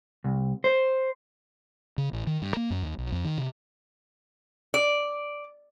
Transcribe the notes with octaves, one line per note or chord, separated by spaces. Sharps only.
C2
C5
C#3
A1
D#3
G2
A#3
F#2
D#2
B1
F2
D#3
C3
D5